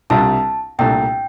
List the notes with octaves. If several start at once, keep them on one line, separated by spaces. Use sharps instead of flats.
C2 C3 G3 D4 F4 A5
C2 A#2 A3 D4 G5